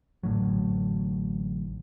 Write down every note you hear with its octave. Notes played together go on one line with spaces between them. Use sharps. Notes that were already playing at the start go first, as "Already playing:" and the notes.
A1 A2 D3 F#3